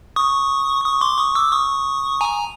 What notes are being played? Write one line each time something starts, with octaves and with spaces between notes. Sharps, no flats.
C#6 D#6
C#6 D#6
C6 D6
C#6 D#6
D6 E6
C#6 D#6
G#5 A#5